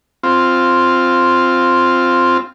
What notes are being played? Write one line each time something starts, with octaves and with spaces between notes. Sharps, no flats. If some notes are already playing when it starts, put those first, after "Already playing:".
C4 F4